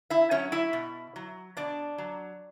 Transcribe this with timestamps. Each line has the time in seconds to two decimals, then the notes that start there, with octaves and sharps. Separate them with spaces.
0.10 E4 E5
0.31 F#3 C#4 C#5
0.52 E4 E5
0.73 B2
1.16 F#3
1.57 B2 D4 D5
1.98 F#3